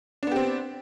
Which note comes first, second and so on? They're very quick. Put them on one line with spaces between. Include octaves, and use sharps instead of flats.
D4 B3 G4 C4